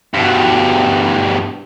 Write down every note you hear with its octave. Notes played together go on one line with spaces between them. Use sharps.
G2 B2